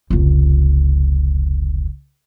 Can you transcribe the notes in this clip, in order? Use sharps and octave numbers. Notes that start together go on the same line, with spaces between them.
F1 C#2